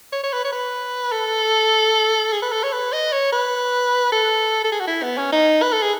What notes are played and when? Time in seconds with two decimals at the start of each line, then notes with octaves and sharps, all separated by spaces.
0.12 C#5
0.24 C#5
0.32 B4
0.44 C#5
0.52 B4
1.12 A4
2.33 G#4
2.42 B4
2.52 A4
2.63 C#5
2.73 B4
2.93 D#5
3.12 C#5
3.32 B4
4.12 A4
4.64 A4
4.72 G#4
4.80 F#4
4.87 E4
5.03 B3
5.17 C#4
5.32 D#4
5.62 B4
5.73 A4
5.83 G#4